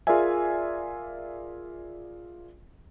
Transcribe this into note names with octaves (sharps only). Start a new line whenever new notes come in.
F4 G#4 A#4 D5 E5 G#5